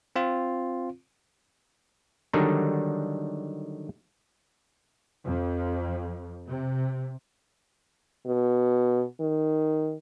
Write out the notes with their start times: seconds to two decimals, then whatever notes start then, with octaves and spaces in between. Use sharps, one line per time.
0.16 C4 F4
2.33 D3 D#3 F#3 G3 D4 D#4
5.26 F2
6.47 C3
8.27 B2
9.21 D#3